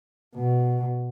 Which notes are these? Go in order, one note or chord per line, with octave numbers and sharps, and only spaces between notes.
B2